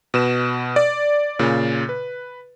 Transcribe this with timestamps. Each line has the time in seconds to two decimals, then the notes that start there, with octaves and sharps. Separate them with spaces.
0.14 B2 B4 E7
0.76 D5
1.39 A#2 C#3
1.89 B4